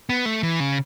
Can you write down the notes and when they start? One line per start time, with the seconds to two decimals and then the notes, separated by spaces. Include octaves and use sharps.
0.09 B3
0.25 A3
0.43 E3
0.60 C#3